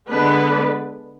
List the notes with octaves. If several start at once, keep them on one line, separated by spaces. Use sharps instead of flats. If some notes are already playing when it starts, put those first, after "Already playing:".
D3 G#3 B3 D4 B4